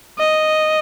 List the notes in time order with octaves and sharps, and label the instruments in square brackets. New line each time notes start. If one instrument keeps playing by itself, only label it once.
[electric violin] D#5